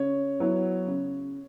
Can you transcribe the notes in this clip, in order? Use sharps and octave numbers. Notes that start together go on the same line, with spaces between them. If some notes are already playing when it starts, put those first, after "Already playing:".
Already playing: C#3 C#5
F#3 B3 E4
C#3